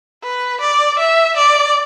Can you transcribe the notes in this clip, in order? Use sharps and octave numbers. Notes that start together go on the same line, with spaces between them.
B4
D5
E5
D5